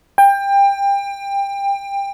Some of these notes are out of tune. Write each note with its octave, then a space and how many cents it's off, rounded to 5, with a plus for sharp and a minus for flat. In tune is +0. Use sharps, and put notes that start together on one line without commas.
G5 +25